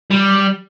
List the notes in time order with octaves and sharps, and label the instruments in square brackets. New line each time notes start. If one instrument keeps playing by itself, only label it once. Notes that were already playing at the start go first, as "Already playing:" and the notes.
[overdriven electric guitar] G3